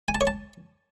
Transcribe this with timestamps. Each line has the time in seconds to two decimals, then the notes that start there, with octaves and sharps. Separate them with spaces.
0.08 G#5
0.15 A5
0.21 C#5
0.27 A5